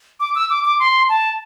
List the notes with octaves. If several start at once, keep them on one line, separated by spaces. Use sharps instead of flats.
D6
E6
D6
D6
C6
A5